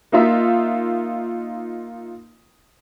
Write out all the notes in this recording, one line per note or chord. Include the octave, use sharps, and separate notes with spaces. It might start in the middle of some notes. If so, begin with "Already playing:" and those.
A#3 D#4 F4 E5